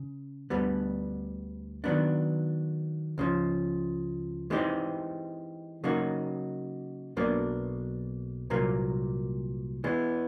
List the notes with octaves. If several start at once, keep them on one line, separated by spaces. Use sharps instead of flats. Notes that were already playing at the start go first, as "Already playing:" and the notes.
Already playing: C#3
D2 D3 G3 B3
D#3 F#3 B3 D4
C#2 C#3 F3
E3 G#3 C4 D#4 G4
C#3 F#3 A#3 D#4 F#4
B1 B2 F#3 A#3 D4
C2 A#2 F#3 A#3
E3 G#3 B3